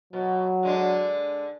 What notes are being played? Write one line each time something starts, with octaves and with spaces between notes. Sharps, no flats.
B2 F#3
D3 G#3 D4